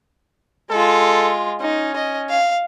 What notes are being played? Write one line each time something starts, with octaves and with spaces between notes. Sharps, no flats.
G#3 F4 A4
C#4 D#4
D#5
F5